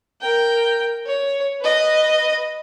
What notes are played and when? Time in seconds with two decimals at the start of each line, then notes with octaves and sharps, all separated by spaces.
0.21 A#4 G5
1.06 C#5
1.61 B4 D#5